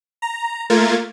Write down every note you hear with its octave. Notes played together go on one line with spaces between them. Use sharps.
A#5
A3 A#3 F4 A#4 G#6 A6